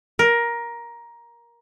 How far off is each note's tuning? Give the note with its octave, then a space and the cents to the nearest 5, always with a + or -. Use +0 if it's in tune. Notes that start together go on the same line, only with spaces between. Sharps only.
A#4 +15